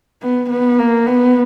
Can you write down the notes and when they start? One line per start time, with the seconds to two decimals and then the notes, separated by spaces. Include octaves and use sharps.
0.22 B3
0.50 B3
0.79 A#3
1.07 B3